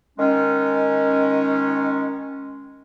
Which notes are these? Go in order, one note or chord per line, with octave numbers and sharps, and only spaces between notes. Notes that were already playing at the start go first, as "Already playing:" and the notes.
D#3 G#3 C#4